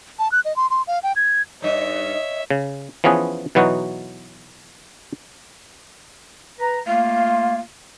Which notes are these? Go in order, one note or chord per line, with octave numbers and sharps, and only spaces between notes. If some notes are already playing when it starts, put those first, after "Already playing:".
A5
F#6
D#5
C6
C6
F5
G5
G#6
G2 D#4 C#5 D#5 E5
C#3
E3 F3 B3 C#4 G#4 B4
B2 E3 F#3 B3 D#4 F#4
B4 A#5
A3 A#3 F4 F5